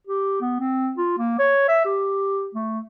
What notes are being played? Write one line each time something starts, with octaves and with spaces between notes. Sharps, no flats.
G4
B3
C4
F4
A#3
C#5
E5
G4
A3